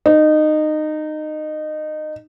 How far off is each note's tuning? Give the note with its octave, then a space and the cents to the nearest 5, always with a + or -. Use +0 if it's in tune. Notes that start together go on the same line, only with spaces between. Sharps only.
D#4 -20